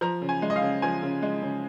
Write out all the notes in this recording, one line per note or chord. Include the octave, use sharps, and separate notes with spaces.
F3 A#5
C#3
G#5
G#3
D#5
F5
C#3
F3 G#5
C#3
G#3
C#3